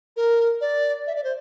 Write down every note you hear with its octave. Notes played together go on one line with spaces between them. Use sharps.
A#4
D5
E5
D5
C5